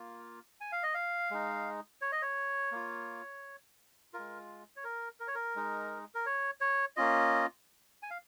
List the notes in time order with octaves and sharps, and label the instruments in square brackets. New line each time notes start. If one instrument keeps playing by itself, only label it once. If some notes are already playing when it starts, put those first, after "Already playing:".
Already playing: [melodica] A#3 F4
G#5
F5
D#5
F5
G#3 D#4
C#5
D#5
C#5
A#3 F4
F4 A#4
G#3
C#5
A#4
A#4
C#5
A#4
G#3 D#4
A#4
C#5
C#5
A#3 C#4 F4 D#5
G#5
F5